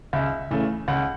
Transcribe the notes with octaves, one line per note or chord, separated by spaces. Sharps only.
C#2 E5
C#3 E3 A3
C#2 F#5